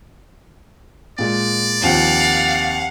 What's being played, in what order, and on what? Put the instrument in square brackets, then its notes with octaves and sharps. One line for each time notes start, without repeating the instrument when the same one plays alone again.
[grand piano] A#2 G#3 [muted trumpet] D5
[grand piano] D#2 F3 C4 [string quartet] F5 F#5